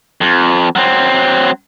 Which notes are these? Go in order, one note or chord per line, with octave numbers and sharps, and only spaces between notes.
F2
F#3 C4